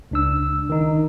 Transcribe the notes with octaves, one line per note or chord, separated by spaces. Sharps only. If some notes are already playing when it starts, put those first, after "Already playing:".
C#2 D4 E6
D#3 D#4